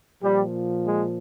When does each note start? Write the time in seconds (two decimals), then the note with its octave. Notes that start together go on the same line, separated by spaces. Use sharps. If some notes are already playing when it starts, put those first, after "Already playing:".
0.22 A#2 F3 G3
0.86 G#3